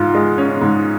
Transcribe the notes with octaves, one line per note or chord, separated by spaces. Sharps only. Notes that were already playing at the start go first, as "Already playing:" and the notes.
Already playing: G#2 F4
G#3
C#4
G#2